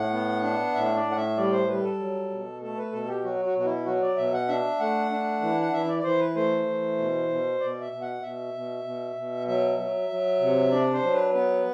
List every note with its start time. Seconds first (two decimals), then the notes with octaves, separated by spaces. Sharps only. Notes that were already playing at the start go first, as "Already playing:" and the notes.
Already playing: A2 F#5
0.13 B3
0.43 D4
0.74 A2 E5
0.95 D5
1.05 A2
1.11 F#5
1.16 E5
1.37 G3 D5
1.52 C5
1.68 G3 B4
1.83 A4
1.99 F#3
2.31 B2
2.61 A3 A4
2.78 B4
2.92 B2 A4
3.08 G4
3.23 F#3 F#4
3.45 F#4
3.56 B2 F#4
3.65 E4
3.86 F#3 F#4
4.02 D5
4.17 B2 E5
4.33 F#5
4.48 D4 E5
4.80 A3 F#5
5.11 D4
5.41 E3
5.61 F#5
5.73 E3 E5
5.89 D5
5.99 D5
6.04 E3 C5
6.19 B4
6.35 A3 C5
6.67 E3
6.98 B2
7.29 B2
7.60 B2 D5
7.81 E5
7.92 B2
8.02 F#5
8.22 B2 E5
8.54 B2
8.84 B2
9.16 B2
9.48 F#3 E5
9.79 F#3
10.10 F#3
10.40 C3
10.71 D4 D5
10.93 C5
11.03 F#3
11.14 B4
11.34 B3 B4